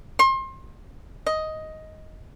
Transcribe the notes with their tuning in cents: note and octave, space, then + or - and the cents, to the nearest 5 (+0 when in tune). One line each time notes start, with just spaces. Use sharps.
C6 +30
D#5 +10